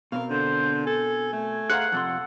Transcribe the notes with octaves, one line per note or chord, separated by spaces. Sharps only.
B2 C4 A#4 F5
D3 C5
A4 G#5
A3
G#4 C5 F5 F#5 A#5
F2 C3 A4 C6